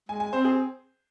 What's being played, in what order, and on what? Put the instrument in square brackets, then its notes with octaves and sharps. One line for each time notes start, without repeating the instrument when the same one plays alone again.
[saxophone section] G#3 [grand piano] G#5
[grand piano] G#5
[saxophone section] C4 [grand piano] C5
[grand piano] G#4